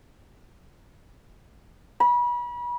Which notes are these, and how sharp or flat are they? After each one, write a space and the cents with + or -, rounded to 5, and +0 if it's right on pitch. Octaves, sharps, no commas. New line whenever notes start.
B5 -35